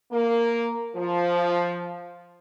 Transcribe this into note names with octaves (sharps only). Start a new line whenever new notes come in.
A#3
F3